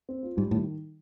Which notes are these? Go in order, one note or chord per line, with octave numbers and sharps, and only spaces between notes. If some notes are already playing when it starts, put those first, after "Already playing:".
C4
F4
G#2 G3
A2 D#3